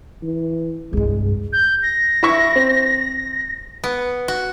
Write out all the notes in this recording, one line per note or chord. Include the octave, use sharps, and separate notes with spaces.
E3
C2 G2 G#3
G6
A#6
E4 E5 C#6
C4
B3
F#4